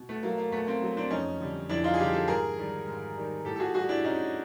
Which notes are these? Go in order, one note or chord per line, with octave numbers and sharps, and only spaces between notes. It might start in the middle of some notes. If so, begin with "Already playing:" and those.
Already playing: B2
A3 B3
F#3 A#3
A#3
B2 A3 B3
A#3 C4
F#3
C4 D4
F2 C#4 D#4
D3 G3
F2 D4 E4
D#4 F4
G#4
D3 G3 F4 G4
G4 A4
G#2 G#4 A#4
D#3 G3
G#2
D#3 G3
A2 G4 A4
A4
F#4 G#4
E3 G3 F#4 G#4
D4 E4
A2 C#4 D#4